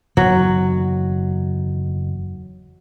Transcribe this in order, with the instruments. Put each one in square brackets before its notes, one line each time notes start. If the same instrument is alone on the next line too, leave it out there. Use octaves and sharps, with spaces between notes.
[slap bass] F#1 E2 D#3 [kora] F#3